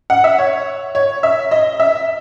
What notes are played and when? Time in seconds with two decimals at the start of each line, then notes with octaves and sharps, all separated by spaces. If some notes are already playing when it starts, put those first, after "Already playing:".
0.10 F#5
0.24 E5
0.38 C#5
0.95 C#5
1.23 E5
1.51 D#5
1.80 E5